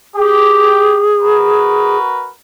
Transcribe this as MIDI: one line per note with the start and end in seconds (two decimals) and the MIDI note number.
0.16 1.01 67
0.16 1.97 68
1.21 2.30 66
1.21 2.30 70
1.21 2.30 71